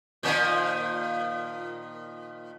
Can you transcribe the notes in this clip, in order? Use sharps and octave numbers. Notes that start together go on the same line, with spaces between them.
A#2 D#3 F3